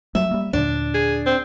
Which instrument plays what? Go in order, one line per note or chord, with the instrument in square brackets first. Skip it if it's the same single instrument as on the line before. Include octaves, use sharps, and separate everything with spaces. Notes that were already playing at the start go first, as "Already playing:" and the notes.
[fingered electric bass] F#3 G3 A3 [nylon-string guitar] E5
[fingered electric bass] G3 A#3
[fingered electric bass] D#2 A#2 D3 [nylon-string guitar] D4
[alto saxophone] G#4
C4